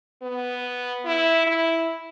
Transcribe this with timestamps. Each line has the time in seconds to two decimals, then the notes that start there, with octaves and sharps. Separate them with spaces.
0.22 B3
1.05 E4
1.47 E4